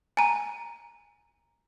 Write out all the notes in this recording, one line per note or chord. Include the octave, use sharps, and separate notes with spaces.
G#5 A#5